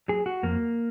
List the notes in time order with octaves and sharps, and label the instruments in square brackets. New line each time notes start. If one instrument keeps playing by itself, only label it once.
[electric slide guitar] F#3 G#4
F#4
F2 A#3